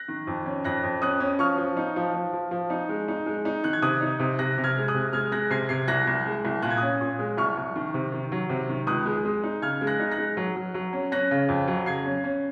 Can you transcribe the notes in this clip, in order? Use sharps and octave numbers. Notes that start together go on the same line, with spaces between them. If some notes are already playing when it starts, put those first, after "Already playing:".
Already playing: F#6 A#6
D#3
F2
C#4
F2 F#6 A#6
F2
C#4 D#6 F#6
C#4
F3 C#6 F6
F3
D#4
F3
F3
F3
F3
D#4
G#3
D#4
G#3
D#4
D#3 F#6
G#6
C3 D#6 F#6
D#4
C3
C3 F#6 A#6
C3
F6 G#6
G#3
D#6 F#6
C3
G#3 F6 G#6
G#3 F#6 A#6
C3 G#6 C7
C3 G#6 C7
C2 F#6 A#6
C2
G#3
C2
A#2 F#6
G#6
C#4 D#6 F#6
A#2
G#3
C2 C#6 F6
C2
D#3
C3
D#3
F#3
C3
D#3
C#2 D#6 F#6
G#3
G#3
D#4
C#3 F6 G#6
G#3
F#6 A#6
D#4
F#6 A#6
G#3
F#3
F#3
F#3
C#4
C#4 F#6 A#6
C#3
F2
F#3
C#3 G#6 C7
C#4
C#4